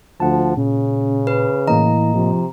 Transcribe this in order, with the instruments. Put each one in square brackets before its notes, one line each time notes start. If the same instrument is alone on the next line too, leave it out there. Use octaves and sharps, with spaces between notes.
[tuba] D2 [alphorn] F3 [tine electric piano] F#5 A5
[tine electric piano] A#2 [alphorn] C#3 [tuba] C#4
[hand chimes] B4
[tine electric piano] A2 A#3 D#5 [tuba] E3 [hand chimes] A#5
[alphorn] C3 [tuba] F3